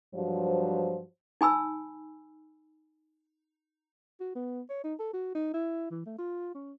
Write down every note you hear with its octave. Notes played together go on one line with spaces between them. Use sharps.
G2 F3 F#3 C5
D#4 G#5 B5 E6
F#4
B3
C#5
D#4
A4
F#4
D#4
E4
E3
A3
F4
C#4